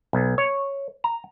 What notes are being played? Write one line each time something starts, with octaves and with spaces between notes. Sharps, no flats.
B1
C#5
A#5